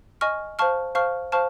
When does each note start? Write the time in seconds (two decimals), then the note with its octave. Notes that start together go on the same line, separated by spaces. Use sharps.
0.21 D#5 G#5 C#6 F6
0.59 C5 F5 A5 C#6 F6
0.95 C5 F5 A5 C#6 F6
1.32 C5 F5 A5 C#6 F6